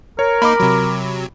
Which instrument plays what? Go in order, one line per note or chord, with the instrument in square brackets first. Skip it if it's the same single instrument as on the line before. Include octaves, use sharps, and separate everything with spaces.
[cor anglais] A#4 [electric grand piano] C#5
[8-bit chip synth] A#3 D#4 [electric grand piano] B5 D6
[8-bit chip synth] C3 F#3